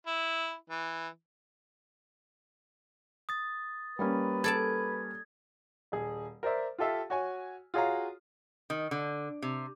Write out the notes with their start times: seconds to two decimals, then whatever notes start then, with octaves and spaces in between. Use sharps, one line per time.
0.07 E4
0.70 E3
3.29 D#6 A6
3.99 G3 A#3 C#4 B4
4.44 A4 D5 A5 G#6
5.92 D#1 G#4
6.43 A#4 C5 D5 E5
6.78 F4 G4 A4 E5 F5
7.10 F#4 C#5 G#5
7.74 F4 F#4 G#4 C#5 F5 A#5
8.70 D#3
8.91 D3
9.42 C3